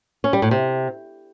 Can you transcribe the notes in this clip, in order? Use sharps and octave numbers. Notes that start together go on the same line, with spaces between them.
C#4
G3
A2
C3